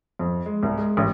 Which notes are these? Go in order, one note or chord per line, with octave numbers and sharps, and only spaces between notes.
F2
G#3
C2
G#3
A1